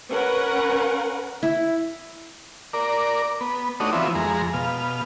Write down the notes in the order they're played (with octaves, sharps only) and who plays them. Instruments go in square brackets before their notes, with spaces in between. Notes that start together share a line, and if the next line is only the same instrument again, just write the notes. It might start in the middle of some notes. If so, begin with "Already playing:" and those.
[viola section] C#4 A#4 B4 F#5
[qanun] E4
[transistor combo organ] A#4 D5
B3
A3 D4 D#4 F#4 C#5 D#6
E3 F3 B3 C4 E4
F2 G#3 A#5
B2 F5